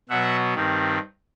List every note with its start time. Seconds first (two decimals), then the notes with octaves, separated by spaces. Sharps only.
0.09 B2 F#3 B3 E5 F#5
0.54 G2 D#3 G3 C4